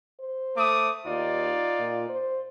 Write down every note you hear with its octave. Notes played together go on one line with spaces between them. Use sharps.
C5
A3 D6 D#6
D#2 D#4 F4 D5
A#2
C5